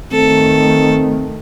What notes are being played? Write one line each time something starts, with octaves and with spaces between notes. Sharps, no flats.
D#3 A3 C4 A4